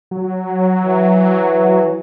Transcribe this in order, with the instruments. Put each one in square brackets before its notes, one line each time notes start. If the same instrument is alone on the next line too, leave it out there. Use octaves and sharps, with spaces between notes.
[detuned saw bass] F#3
[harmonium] E3